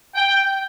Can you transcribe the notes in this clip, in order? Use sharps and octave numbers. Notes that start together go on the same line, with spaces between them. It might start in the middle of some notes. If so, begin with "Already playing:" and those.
G5